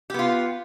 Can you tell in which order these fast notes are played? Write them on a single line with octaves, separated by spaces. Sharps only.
G4 B3 F4